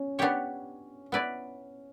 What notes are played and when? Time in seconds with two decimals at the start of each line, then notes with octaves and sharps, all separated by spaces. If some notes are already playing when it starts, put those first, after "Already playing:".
Already playing: C#4
0.19 B3 D4 G4 C#5
1.12 B3 E4 B4 D5